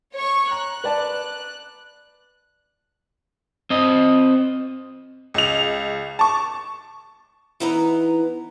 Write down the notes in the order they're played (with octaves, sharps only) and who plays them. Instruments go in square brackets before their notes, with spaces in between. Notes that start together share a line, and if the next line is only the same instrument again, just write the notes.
[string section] C#5 C#6
[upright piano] A#5 [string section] F#6
[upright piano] B4 D5 A5
[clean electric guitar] C4 D#5
[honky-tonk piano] C#2 F7
A5 C#6
[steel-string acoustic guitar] E3 B3 D#4 E4 B4 A#5